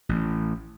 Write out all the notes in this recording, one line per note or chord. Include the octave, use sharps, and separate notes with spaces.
A1